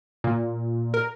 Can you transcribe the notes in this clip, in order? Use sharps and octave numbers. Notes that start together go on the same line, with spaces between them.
A#2
A#4